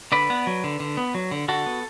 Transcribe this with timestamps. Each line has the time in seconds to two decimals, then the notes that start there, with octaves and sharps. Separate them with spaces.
0.12 D3 B4 D5
0.30 B3
0.47 F#3
0.64 D3
0.80 D3
0.97 B3
1.15 F#3
1.31 D3
1.48 D3 F#4 A4
1.66 B3